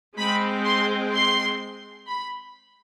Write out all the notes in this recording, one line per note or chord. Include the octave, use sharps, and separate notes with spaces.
G#3 C4 B5
C6
C6
B5